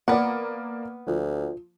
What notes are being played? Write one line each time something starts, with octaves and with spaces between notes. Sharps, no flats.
A#3 B3 D5 F#5
D2 F3